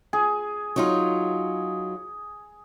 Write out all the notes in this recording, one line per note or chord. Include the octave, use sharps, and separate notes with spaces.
G#4
F#3 D#4 F4